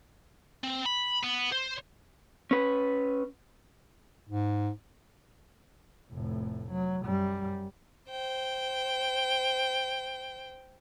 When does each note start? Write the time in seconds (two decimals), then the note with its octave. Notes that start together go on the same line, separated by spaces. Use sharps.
0.64 C4
0.86 B5
1.23 B3
1.52 C5
2.51 C#4 B4
4.28 G#2
6.12 F1 A2
6.71 F#3
7.03 F#2 G3
8.10 C5 G5